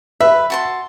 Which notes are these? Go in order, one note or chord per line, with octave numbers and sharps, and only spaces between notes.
B4 E5
F#4 A5 C6